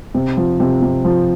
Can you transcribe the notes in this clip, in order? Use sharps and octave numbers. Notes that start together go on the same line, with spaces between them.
C3
F3
C3
C3
F3